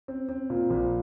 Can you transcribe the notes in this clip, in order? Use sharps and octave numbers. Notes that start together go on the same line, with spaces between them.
C4
C4
A#2
A#1